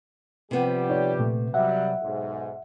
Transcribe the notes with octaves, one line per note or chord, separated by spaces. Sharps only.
C3 F3 G3 B3 G4
D#4 C#5 D5
A#2 A3
F#3 G3 E5 F#5
B1 G#2